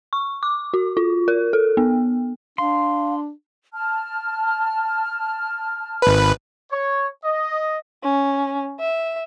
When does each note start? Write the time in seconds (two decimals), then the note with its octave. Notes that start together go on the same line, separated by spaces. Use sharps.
0.13 C#6
0.43 D6
0.74 F#4
0.97 F4
1.28 A#4
1.53 A4
1.77 B3
2.58 D4 F5 C6
3.73 A5 F6
6.02 G#1 B4
6.72 C#5
7.25 D#5
8.04 C#4
8.80 E5